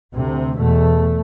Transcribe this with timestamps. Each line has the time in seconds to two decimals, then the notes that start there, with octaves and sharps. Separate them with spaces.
0.14 D2 C3
0.57 E2 B2 A3